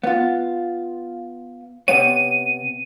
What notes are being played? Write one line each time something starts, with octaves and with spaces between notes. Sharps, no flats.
B3 F4
C3 B3 C#5 D#7